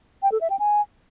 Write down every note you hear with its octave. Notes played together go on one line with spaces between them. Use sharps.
G5
A4
E5
G5
G#5